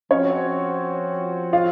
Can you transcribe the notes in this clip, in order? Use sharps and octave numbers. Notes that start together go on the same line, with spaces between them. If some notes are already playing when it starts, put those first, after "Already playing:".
F3 C4 C#4 F#4 C#5
F4 F5